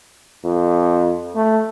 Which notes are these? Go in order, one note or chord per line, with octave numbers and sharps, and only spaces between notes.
F2
A3